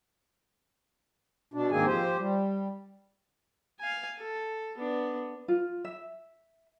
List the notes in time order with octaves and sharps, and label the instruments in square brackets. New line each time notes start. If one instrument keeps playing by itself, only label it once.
[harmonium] B2 D4
G#2 D#3 A#3 C4 G#4 G#5
F3 G4 C5
G3
[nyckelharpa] F5 G#5
A4
B3 D4
[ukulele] F4
E5